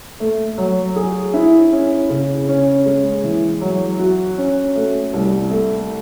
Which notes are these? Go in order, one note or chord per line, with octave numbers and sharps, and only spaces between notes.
A3
F#3
G#4
E4
C#4
C#3
C#4
G#3
E3
F#3
F#4
C#4
A3
C2
A3